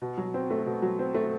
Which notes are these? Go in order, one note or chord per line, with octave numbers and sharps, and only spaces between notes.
B2
F#3
C4
A3
B2
F#3
C4
A3